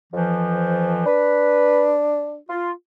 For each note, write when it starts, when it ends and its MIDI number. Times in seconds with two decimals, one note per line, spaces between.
0.13 1.05 41
0.13 1.05 52
0.13 1.05 53
1.06 2.37 62
1.06 1.93 71
2.49 2.71 65